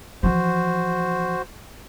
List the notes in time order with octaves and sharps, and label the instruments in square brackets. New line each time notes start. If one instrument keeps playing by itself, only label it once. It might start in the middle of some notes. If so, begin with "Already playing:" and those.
[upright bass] E3 F3 [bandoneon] F#4 C5